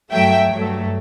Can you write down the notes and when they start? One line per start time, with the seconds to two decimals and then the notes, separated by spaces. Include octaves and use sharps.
0.12 G2 F#3 A3 E5 G5
0.51 G2 F#3 A3